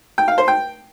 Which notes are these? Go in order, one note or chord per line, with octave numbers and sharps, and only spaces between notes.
G5
F5
C5
G5